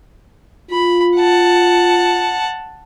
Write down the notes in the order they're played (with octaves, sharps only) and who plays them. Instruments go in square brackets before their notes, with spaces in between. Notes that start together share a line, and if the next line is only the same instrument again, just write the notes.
[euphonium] F4 [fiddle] B5
[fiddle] F#5 A5